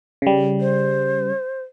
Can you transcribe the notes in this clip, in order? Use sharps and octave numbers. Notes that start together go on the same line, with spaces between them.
C#3 G3
C5